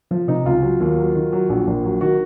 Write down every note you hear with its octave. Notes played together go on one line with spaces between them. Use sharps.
F3
C3 D#4
C#2 F4
F#3
D#2
F#3
D#3
F#3
A#1
A#1
F#3
D#3 F#4